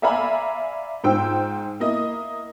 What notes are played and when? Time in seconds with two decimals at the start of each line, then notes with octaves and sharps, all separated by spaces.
0.02 D5 E5 F5 G#5 A#5 B5
1.04 G#2 F4 C5 G5 E6
1.80 A#3 E4 D#5